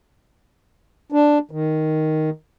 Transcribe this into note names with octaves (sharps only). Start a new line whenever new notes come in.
D4
D#3